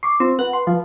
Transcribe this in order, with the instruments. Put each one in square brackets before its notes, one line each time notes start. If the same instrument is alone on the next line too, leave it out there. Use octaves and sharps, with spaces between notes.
[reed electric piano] C#6 D6 [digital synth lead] C7
[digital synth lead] C4 [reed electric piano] F4
[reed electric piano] B4 [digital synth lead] F#5
[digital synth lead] C6
F3